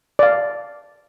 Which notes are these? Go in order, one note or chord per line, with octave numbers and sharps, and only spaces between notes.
D5 F5